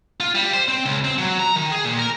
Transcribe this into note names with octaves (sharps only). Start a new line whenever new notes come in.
F4
G3
C5
C4
C#2
C4
F#3
A#5
D#3
G#4
A#2
A#4